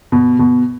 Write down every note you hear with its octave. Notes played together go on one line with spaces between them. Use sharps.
B2
B2